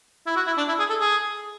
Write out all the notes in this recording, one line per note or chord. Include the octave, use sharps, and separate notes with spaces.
E4
F#4
E4
D4
E4
G#4
A4
G#4